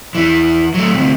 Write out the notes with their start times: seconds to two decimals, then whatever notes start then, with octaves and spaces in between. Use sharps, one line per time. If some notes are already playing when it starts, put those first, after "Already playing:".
0.15 E2 E3
0.74 F#3 A3
0.94 D2 C3